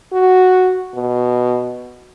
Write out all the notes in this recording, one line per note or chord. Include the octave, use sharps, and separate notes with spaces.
F#4
B2